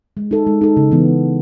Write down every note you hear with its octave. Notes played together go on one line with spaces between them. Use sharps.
G#3
D#4 A4
G#3
D#4 A4
C#3
E3 B3